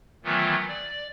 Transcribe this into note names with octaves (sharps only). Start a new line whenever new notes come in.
D#3 E3 F#3 A3 B3 F4
D5